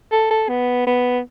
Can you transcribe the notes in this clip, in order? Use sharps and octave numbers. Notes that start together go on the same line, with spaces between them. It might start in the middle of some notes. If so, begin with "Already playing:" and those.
A4
A4
B3
B3